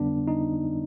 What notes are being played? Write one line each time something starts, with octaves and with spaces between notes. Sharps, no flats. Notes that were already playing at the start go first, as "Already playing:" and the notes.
Already playing: F2 D3 G3 B3 D4
D#4